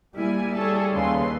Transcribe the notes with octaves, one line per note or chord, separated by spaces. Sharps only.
G3 A#3 E4 G#5
G#4 A4 C#5 A5
D#2 C#3 B4 C6